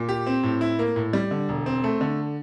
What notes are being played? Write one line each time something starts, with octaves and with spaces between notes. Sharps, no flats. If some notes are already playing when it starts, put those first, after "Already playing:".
Already playing: A#2
G4
C4
A2
E4
A#3
A2
G3
D3
E1
C4
A3
D3